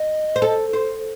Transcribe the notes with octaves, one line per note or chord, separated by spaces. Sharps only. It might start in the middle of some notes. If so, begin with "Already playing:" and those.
Already playing: D#5
C5
A4
C5